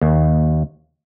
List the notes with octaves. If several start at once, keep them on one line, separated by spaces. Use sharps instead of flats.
D#2